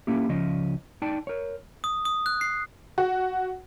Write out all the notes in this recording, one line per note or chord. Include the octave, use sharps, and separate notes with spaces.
A#3 C#4 E4 G4
C#2 C#3 F3 C#4 D#5
D#4 D5 G5 A5
A#4 C#5
D#6
D#6
F#6
C7
F#4